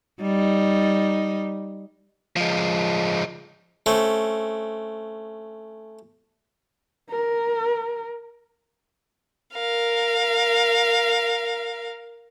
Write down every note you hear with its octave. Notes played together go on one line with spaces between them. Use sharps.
G3 D#4
F3 G#3
A3 C4 C#4
A#4
A#4 F5